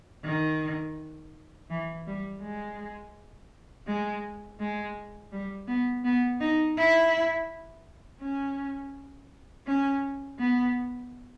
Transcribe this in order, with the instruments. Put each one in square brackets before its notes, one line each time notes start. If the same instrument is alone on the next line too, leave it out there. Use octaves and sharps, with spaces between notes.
[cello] D#3
E3
G3
G#3
G#3
G#3
G3
B3
B3
D#4
E4
C#4
C#4
B3